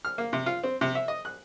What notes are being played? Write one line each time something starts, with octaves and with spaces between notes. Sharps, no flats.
F6
A#3
C3
F4
C4
C3
E5
D#5
F#6